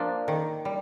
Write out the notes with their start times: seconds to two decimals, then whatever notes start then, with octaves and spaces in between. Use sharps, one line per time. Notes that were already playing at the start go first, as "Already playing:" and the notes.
Already playing: F3 A#3 D4
0.28 D#3
0.65 G3